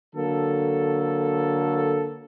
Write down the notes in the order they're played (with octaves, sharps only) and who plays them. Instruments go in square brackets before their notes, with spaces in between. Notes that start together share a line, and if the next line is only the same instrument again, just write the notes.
[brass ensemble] D3 F#3 A#3 A4